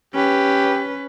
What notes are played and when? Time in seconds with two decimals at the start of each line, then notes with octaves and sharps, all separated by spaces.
0.14 C#4 G4 B4